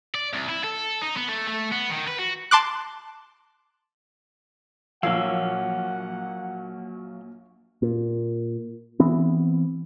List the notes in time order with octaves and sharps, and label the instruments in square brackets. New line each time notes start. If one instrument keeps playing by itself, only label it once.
[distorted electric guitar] D5
C2
E4
A4
D#4
B3
A3
A3
B3
D#3
B4
F#4
[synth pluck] A5 C6 D6 F#6
[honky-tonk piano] A#1 E6 [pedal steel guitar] F#3 A#3 [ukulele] A#4 C#5 F5 [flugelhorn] F#5
[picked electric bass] A#2
E3 B3 C4